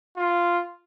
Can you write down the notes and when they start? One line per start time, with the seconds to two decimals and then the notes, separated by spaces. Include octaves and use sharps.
0.17 F4